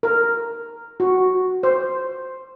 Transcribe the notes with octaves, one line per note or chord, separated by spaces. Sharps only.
A#4
F#4
C5